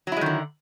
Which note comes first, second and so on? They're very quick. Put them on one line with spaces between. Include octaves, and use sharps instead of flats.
F#3 E4 G#3 D#3 D3